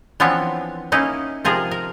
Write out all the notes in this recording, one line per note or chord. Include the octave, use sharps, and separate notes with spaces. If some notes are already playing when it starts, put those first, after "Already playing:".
E3 F3 B3 C4 D4 C#5
A#3 C#4 D#4 E4
C3 F3 G#4 A#4
A#4